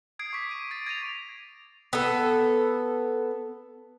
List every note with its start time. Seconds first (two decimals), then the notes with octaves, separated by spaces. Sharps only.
0.19 D#6 G#6 C7 D7
0.33 C#6 D6 B6
0.51 D#7
0.71 D6 A6 D7
0.87 G#6 A#6 D#7 F7
1.93 B3 A4